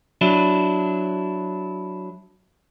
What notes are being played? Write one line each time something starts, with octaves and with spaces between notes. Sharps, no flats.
F#3 D4 E4